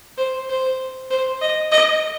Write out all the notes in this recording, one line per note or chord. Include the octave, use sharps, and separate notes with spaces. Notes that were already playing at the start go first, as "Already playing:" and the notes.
C5
C5
C5
D#5
D#5